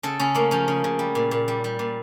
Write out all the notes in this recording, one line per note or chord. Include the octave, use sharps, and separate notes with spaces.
C#3 A4
C#3 C#4
A3 A#3
F3 C#4
C#3
C#3
G3
A#2
A#2
G3
G3
A#2